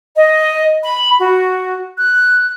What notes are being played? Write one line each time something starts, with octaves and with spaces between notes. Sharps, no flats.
D#5
B5
F#4
F#6